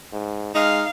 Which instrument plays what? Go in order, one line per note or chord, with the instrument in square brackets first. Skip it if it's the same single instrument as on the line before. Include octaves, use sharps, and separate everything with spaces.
[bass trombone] G#2
[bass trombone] G#3 [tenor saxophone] D#4 [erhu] F5